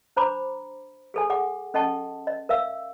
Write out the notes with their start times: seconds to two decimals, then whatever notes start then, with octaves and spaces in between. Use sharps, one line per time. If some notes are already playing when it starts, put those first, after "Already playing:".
0.16 D4 C5 A#5 B5 D6
1.14 G#4 A4 G#5
1.30 G#4 F#5 D6
1.74 C#4 A4 D#5 F#5 A5 C#6
2.27 D#5
2.49 A#4 E5 F5 E6